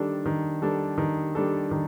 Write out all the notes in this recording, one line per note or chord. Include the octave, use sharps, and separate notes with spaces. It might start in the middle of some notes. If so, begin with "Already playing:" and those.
Already playing: D#3 G3 D4 A4
D#3
G3 D4 A4
D#3
G3 D4 A4
D#3